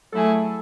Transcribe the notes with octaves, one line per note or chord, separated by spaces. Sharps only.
F#3 A3 E4 G#4 A4